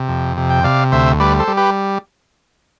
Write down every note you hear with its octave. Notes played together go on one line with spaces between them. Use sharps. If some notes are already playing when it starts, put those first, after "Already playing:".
Already playing: C3
F2
C3
G5
C3 D5 F5
D2 C5 E5
G3 B4 D5
A4 C5
G3
G4 B4